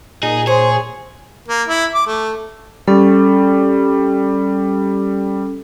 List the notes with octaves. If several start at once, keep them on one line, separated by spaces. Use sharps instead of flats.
A#2 D#4 G#4
G#4 C5 C#5
A#3
E4
D6
A3
G3 C#4 A4